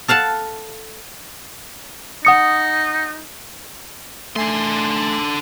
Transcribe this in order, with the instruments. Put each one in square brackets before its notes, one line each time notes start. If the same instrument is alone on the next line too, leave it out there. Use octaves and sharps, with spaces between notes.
[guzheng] A4 F5 F#5 A5
[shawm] D#4 [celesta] F#5 D#6 C#7
[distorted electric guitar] D3 C6 [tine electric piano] A3 G#5 C7